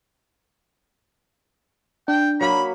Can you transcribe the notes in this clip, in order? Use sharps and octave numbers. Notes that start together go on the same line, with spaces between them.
D4 G5
F#3 A#3 B5